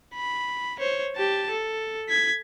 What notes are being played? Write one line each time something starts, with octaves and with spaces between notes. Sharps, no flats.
B5
C5 C#5
G4 A5
A4
G#6 B6